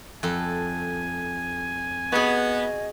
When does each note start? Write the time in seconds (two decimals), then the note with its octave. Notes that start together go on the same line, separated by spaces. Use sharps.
0.23 F2 A4 G#5
2.12 B3 F#4 G#4 D#5